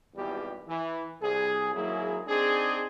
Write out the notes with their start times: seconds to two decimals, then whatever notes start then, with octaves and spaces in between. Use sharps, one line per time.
0.16 G#1 E2 B2 E3 G3 G4
0.68 E3
1.21 C2 G#4
1.73 G#1 F#3 A#3 E4 G#4
2.27 C4 D4 D#4 G#4